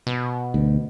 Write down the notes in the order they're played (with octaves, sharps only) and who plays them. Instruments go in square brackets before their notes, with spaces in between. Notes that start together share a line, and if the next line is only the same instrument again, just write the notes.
[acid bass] B2
[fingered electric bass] D2